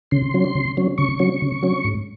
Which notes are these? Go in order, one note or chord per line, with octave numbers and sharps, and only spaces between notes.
C#3 C6
F#3 C#4
C#3
F#3 C#4
C#3 C#6
F#3 C#4
C#3
F#3 C#4
G#2